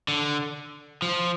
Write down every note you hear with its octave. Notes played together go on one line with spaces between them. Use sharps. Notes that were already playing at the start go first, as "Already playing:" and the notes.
D3
F3